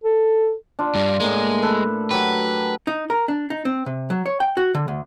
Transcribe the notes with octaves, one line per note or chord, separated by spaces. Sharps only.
A4
D4 F4
G2 G3
A2 G#3 A#3
A4 B4
F#3 G4 B4
D#4
A#4
D4
D#4
C4
C3
F#3
C#5
G5
F#4
D3
D2